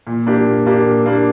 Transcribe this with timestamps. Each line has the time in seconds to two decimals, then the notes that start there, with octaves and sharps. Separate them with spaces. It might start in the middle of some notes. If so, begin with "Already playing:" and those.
0.07 A#2
0.27 A#3 D4 G4
0.46 A#2
0.66 A#3 D4 G4
0.86 A#2
1.06 A#3 D4 G4